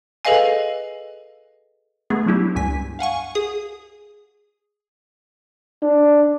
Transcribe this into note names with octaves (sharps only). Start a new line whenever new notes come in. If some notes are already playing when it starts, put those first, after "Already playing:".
G#4 A4 B4 D#5 F5 G#5
A3 B3 G#4
F#3 D4 E4 G4
C#2 G2 G#5 B6
F5 F#5 G#5 C#6
G#4 D#6
D4